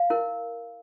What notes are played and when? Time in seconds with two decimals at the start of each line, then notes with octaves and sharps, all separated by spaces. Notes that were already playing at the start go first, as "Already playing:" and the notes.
Already playing: F5
0.10 E4 A#4